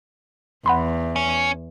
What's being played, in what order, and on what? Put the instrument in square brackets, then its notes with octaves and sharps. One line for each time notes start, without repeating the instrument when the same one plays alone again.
[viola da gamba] E2 [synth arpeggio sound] F#5 B5 C6
[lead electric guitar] C#4